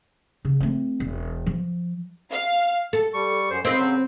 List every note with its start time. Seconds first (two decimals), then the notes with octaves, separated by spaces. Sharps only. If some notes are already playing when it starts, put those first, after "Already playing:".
0.45 C#3
0.60 A3 C4
1.00 E1
1.46 F3
2.32 F5
2.93 A4
3.14 G3 C#6
3.50 F#2 C5
3.65 C4 B4 D#5 F5
3.78 C#3 F#3